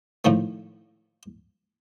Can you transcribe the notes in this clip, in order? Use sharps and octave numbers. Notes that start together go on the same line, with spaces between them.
A2 D#3 F3 A3